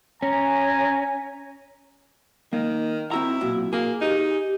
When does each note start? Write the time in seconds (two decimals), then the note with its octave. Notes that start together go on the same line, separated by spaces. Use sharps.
0.22 C#4 G#5 A#5
2.53 D#3 A#3
3.11 C4 E4 F#4 A#5
3.41 B1 A#2 F#4
3.73 A#3 G#4
4.01 D#4 G4